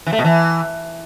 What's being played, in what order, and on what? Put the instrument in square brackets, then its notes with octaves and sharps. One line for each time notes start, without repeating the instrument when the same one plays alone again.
[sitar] E3
A3
B2
E3